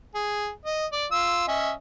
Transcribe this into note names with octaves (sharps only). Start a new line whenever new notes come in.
G#4
D#5
D5
F4 E6
C#4 D#5 E5